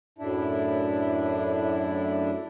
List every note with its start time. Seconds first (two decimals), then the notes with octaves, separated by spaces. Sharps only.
0.18 F#2 A2 D4 E4